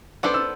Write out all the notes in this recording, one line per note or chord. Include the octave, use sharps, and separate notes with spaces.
B3 D4 A4 C5 D6
E6